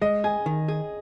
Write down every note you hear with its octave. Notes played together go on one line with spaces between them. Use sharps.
G#3 D#5
G#4 G#5
D#3
G#4